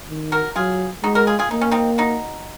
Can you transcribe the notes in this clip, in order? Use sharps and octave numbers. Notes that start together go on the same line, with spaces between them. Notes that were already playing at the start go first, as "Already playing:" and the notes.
D#3
F#4 A#4
F#3 F4 G#4
G#3 D#4 F#4
F#4 A#4
F4 G#4
F4 G#4
A#3 D#4
C#4
C4 D#4
D#4 F#4